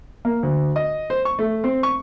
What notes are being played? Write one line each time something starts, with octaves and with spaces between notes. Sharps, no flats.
A#3
D2
D#5
C5
C#6
A3
C4
C#6